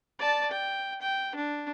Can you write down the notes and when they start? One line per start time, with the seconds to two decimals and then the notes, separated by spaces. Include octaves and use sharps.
0.19 D5 A5
0.50 G5
1.02 G5
1.35 D4